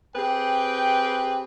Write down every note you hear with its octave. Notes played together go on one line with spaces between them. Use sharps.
C4 G4 G#4 B4 G5